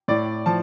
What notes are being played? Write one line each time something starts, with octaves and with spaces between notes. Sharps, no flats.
A2 D5
F3 A5